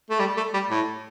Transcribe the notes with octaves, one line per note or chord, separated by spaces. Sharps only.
A3
G3
A3
G3
A2